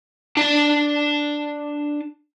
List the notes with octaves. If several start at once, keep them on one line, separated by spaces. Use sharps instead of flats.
D4 A5